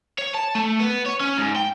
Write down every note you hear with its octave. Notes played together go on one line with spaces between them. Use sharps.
C#5
A5
A3
B3
C#5
C#4
G#2
G5